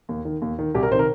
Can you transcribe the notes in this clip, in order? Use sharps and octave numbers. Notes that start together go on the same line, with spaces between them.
D#2
D#3
D#2
D#3
C2 G4
A#4
C3 D#3 A#4 C5